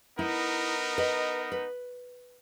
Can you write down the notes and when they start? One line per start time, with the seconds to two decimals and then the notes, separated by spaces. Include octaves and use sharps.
0.19 B3 D#4 E4 A#4
0.98 B4 D#5
1.52 B4